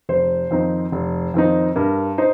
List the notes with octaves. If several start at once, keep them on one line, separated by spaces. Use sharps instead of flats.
F1 C5
F2 D#3 C4 D#4
F1
F2 D#3 C4 D#4
G2 A#4
D#4 C5